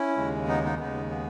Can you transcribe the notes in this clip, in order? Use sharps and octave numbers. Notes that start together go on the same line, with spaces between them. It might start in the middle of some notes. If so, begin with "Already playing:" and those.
Already playing: C#4 E4
D#2 C#3 G#3
B3 D#4
B3 D#4
D#2 C#3 G#3 B3
B3